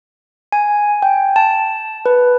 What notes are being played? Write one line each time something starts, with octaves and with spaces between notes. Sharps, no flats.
G#5
G5
A5
B4